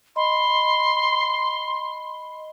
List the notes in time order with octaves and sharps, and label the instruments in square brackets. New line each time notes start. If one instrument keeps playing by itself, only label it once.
[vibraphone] D#5 B5 [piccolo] C6